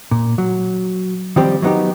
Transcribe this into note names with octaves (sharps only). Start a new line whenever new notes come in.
A#2
F#3
D#3 F3 G3 C4 G4 C5
F#3 G3 B3 D#4 G4